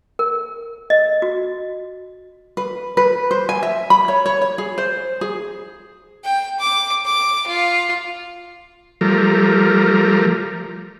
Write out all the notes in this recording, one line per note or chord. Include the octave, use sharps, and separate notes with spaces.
A#4
D#5
F#4
B4
B4
C5
G#5
E5
B5
C#5
C#5
C#5
G#4
C5
G#4
G5
D6
D6
F4
F3 G3 A3 A#4